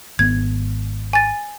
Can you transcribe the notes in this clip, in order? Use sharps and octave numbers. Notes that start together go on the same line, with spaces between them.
G#1 B3 G#6
G#5 A6